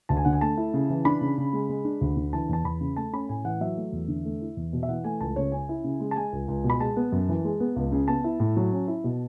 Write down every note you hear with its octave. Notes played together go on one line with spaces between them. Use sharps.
D2 A5
G#5
D3 F#5
G#5
A3 A5
E4
C#3
E3
D4 B5
C#3
C#3
G#3
G#3
D4
D2
D3
E3 A5
E2 A5
E2 B5
C#3
A3 A5
C#4 B5
A2 G#5
E3 F#5
F#3 E5
A3
E2
D3
A3
E4
E2
B2
E5
E3 F#5
A3 G#5
C#2 A5
C#3 C#5
C#4 G#5
E4
C#3
G#3
A5
G#3 G#5
C#2
C#2
B2
B5
G#3 A5
B3
F#2
E3
G#3
B3
C#2
C#3
B3 A5
E4
A2
F#3
C#4
E4
B2